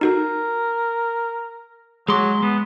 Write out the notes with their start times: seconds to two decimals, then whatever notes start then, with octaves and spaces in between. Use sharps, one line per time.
0.01 D#4 F#4 A4 A#4
2.08 F#3 G#3 G#4 C6 D6
2.43 G#3 B3